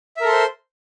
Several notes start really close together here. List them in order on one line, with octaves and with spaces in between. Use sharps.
E5 A#4 A4 C6 C5